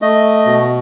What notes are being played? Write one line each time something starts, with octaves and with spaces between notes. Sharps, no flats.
A3 D#5
B2